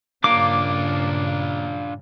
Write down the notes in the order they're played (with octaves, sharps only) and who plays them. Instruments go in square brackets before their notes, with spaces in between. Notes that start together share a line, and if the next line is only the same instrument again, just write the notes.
[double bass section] G2 A#2 C#3 [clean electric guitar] A#3 [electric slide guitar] D4 F4 [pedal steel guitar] D6